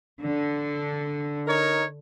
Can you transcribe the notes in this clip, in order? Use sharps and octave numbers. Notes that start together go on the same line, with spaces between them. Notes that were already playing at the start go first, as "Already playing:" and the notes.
D3
D#4 A#4 C#5